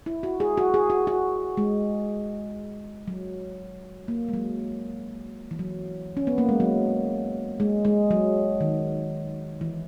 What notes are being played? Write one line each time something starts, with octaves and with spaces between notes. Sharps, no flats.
E4
F#4
G#4
F#4
G#4
F#4
F#4
G#3
F#3
A#3
G#3
F#3
E3
F#3
C#4
B3
A#3
G#3
F#3
G#3
G#3
F#3
D#3
E3